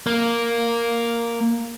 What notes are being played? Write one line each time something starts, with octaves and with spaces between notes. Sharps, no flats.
A#3